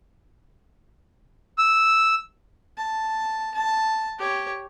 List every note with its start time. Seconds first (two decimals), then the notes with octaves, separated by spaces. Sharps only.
1.58 E6
2.78 A5
3.55 A5
4.18 G4 C#5